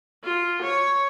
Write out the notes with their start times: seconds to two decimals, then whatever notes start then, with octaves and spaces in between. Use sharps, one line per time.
0.24 F4
0.62 C#5